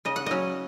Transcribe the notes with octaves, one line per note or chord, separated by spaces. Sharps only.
C#3 D#5
F#5
F#3 C#4 D#5